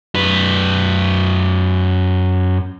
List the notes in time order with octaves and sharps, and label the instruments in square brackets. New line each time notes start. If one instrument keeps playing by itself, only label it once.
[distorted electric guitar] F#2 B4